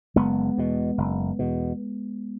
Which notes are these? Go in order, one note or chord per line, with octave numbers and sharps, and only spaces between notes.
F#1 G#3 B3
E2 B2
F#1
E2 B2